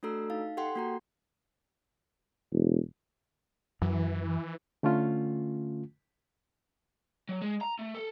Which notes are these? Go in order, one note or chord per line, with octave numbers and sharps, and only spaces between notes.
A3 D4 F#4 A4 A#5 E6
D#4 F5
G4 A4 F#5 G5 C6
A#3 F#4 A#5
E1
F#2 E3
D3 A3 C#4 F4
F#3
G#3
A#5
A3
A4